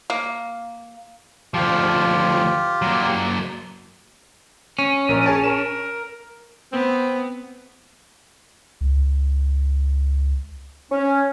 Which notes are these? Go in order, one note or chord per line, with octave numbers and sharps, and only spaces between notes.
A#3
D2 F3 F4 G4
F#3 A#3
C#4
A#1 A#4
G#4 G#5 A5
A#4 E7
B3 C4
C#2
C#4